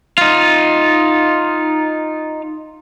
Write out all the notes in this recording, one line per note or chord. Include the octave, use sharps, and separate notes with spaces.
D#4 F4